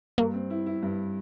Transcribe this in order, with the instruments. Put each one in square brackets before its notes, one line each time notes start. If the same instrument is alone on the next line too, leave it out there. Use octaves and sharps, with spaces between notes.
[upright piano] G2 [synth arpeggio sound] A#3
[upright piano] C4
E4
E4
G2